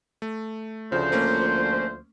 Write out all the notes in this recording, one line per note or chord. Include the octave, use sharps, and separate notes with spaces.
A3
D2 C#3 F3 C5
A3 A#3 C#4